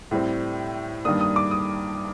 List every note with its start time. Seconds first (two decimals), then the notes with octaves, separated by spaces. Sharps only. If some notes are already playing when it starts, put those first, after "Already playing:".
0.11 A2 G3 C4
1.05 G2 D#3 A#3 D4 D#6
1.21 D#6
1.36 D6
1.51 D#6